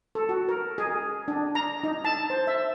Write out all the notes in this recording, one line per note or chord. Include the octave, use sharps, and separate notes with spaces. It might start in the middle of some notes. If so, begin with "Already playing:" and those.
A4
F#4
A#4
G#4
D4
A#5
D#4
A5
C5
E5